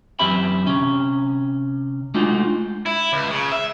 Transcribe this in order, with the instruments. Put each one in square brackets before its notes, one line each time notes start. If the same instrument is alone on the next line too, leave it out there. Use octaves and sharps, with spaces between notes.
[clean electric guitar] F#2 E3 C4 G4 E5 B5
C3 C#4
G#3 A3 D4 D#4 F4 F#4
[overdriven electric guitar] E4
C#2
C#3
E5